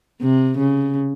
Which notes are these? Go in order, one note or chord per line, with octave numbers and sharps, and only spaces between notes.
C3
C#3